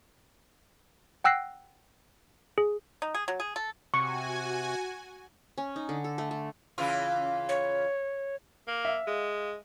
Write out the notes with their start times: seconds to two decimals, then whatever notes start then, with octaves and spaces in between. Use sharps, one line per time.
1.24 F#5 G5 E6 F#6 A#6 C7
2.58 G#4
3.02 D#4
3.14 G#4
3.28 F#3
3.40 G#4
3.56 A4
3.94 C3 F#4 G#5 C#6
5.58 C#4
5.76 D#4
5.89 D3
6.04 A4
6.18 A3
6.31 A3
6.78 C#3 E3 F4
7.49 C#5
8.68 A#3
8.85 E5 F5
9.07 G#3